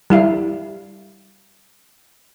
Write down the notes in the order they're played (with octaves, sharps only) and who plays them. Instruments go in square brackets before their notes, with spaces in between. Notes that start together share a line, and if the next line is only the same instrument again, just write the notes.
[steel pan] G3 E4 F5